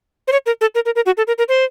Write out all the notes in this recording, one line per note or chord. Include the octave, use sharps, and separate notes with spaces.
C5
C#5
A#4
A4
A#4
A#4
A#4
F#4
A4
A#4
A#4
C5